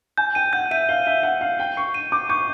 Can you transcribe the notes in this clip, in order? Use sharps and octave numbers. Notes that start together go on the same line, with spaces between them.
G#5 G6
G5 D#7
F#5 G6
E5 D#7
F5 G7
E5 G7
F#5 D#7
F5 C7
G5 G7
C#6 C7
D#7
D6 G6
C#6 G6